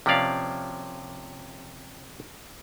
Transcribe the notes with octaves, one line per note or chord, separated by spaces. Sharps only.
C3 F3 A#3 C#4 D5 F5